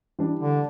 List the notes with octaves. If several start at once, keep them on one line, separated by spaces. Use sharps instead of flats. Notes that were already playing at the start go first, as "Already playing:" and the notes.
E3 G3 D4 G4
D3